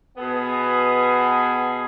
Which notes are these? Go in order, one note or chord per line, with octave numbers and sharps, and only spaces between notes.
B2 B3 G#4